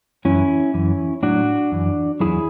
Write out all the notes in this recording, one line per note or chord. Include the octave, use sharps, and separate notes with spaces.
F#2 E3 C#4 E4
F#2 E3
A2 F#3 D4 F#4
F#2 E3
E2 B2 F#3 E4 G#4